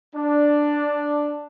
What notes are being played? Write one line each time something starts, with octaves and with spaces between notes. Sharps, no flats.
D4